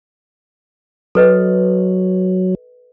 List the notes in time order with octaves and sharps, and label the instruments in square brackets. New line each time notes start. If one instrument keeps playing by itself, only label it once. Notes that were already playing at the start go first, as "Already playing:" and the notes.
[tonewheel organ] F#3 [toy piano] A4 B4 D#5